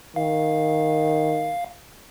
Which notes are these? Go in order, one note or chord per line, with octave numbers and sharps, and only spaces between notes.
D#3 F5